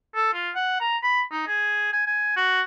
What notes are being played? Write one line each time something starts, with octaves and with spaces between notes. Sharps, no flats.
A4
F4
F#5
A#5
B5
D#4
G#4
G#5
G#5
F#4